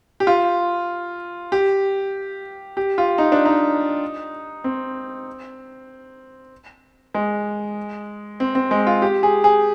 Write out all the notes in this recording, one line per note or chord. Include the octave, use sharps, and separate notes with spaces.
G4
F4
G4
G4
F4
D#4
D4
D#4
C4
G#3
C4
C4
G#3
F4
G4
G#4
G#4